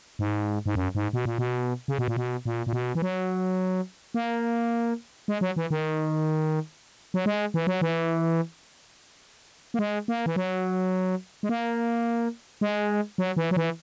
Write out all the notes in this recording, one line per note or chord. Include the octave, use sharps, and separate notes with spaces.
G#2
G#2
F#2
G#2
B2
A#2
B2
C#3
B2
A#2
B2
A#2
A#2
B2
E3
F#3
A#3
G#3
F#3
E3
D#3
F#3
G#3
E3
F#3
E3
A#3
G#3
A#3
E3
F#3
G#3
A#3
G#3
F#3
E3
F#3
E3